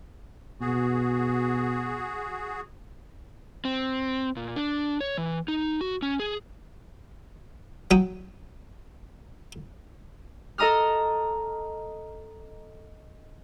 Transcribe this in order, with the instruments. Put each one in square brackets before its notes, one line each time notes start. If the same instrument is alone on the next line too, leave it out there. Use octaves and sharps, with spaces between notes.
[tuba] B2 [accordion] F#4 G#4
[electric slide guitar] C4
A#2
D4
C#5
E3
D#4
F#4
C#4
G#4
[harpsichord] F#3 G5 D#6
[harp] A4 D#5 A#5 D#6 F6